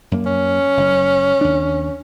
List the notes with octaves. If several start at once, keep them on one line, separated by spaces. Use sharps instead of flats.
F#2 A#3
C#4
F#1
D#2 D4